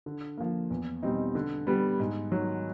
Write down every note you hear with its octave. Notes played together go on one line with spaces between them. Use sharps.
D3
F3 A#3
E2
B2 G3 C4 D#4
D3
G3 B3
G#2
D#3 F#3